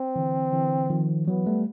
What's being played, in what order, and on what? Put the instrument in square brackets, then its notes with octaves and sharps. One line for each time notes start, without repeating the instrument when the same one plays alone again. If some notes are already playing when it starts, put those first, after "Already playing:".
Already playing: [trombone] C4
[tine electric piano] D3 E3
D3 E3
D#3 F3
[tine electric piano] E3 F#3 [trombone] B3
[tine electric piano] G3 A3